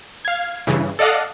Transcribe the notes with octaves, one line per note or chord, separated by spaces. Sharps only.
F5 G#6
G2 C#3 E3
A4 D5 D#5 F5 F#5